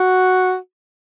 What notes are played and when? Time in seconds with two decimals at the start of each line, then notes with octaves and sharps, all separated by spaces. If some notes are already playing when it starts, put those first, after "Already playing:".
Already playing: F#4